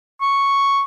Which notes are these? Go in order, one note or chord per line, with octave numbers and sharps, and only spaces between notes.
C#6